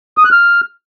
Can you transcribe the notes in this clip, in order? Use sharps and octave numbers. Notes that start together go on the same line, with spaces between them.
D#6
F#6
F6